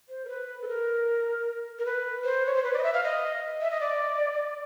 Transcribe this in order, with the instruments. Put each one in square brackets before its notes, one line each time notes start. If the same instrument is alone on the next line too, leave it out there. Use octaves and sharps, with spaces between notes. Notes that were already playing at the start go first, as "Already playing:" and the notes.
[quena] C5
A#4
B4
A4
A#4
A#4
B4
C5
C#5
C5
B4
D5
D#5
E5
F5
D#5
E5
D#5
D5